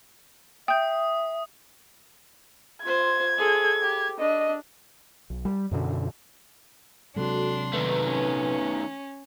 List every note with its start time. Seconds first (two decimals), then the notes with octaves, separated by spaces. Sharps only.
0.68 E5 G5 D#6 G6
2.83 F4 C5 G#6
3.38 G#4 A4
3.82 G4
4.20 D4 D#5
5.30 B1
5.45 G3
5.71 F#2 B2 D3
7.16 C3 F#3 G#3 D4 F#4 A4 C6
7.73 D#3 A3 B4
8.05 C#4